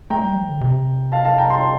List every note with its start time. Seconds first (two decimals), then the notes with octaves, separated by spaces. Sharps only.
0.10 A3 G5 A#5
0.23 G3
0.35 F3
0.48 D3
0.61 C3
1.12 F5 A5
1.25 F5 A5
1.38 G5 A#5
1.50 A5 C6